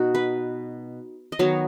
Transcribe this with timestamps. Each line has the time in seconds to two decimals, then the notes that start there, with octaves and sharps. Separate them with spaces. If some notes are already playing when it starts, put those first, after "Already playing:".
Already playing: B2 D#4 F#4
0.15 B4
1.32 D#5
1.39 D#3 F#3 B3 C#5